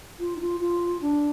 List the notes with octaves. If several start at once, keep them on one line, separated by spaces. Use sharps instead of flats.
F4
D#4
F4
F4
D4